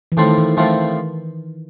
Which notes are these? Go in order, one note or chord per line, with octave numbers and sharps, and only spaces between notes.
E3
A2 D#3 F3 A3 C4 F4
E3
A2 E3 F3 A3 C4 F4